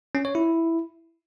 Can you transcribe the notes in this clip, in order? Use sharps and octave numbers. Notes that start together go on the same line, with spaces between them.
C#4
C#5
E4